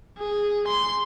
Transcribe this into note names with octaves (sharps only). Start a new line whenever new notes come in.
G#4
C6